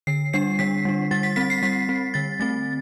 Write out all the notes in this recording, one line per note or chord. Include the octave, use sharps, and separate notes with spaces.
D3 C7
G3 D4 C7
D3 B6
G3 D4
G3 A6
B6
C4 B6
C7
G3 B6
C4
D3 A6
A3 C4 A6